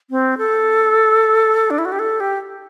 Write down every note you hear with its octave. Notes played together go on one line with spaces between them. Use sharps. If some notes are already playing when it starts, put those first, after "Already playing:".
C4
A4
D4
E4
F#4
G4
A4
G4